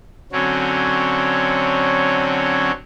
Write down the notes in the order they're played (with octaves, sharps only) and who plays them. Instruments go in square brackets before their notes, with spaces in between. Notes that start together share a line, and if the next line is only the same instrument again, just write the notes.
[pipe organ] D3 F#3 C4 C#4